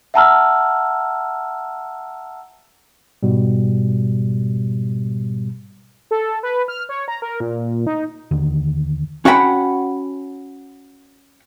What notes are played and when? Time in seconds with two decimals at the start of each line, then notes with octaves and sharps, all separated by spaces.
0.14 E5 F#5 A5 A#5 E6 F6
3.23 G#2 B2 G3
6.11 A4
6.43 B4
6.68 F6
6.89 C#5
7.08 A#5
7.22 A#4
7.40 A#2
7.87 D#4
8.31 D#2 D3 D#3
9.25 C#4 F#4 F#5 G5 A#5 B5